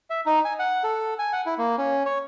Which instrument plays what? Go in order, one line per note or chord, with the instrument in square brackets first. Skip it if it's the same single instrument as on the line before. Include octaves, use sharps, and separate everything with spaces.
[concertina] E5
D#4
G#5
F#5
A4
G#5
F#5
E4
A#3
C#4
C#5